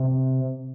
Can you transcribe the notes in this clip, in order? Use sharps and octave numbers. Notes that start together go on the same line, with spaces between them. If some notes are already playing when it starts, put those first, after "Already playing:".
Already playing: C3